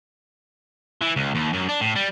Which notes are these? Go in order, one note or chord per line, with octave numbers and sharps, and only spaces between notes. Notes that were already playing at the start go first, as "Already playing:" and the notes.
E3
C#2
D#2
F#2
D4
A2
G3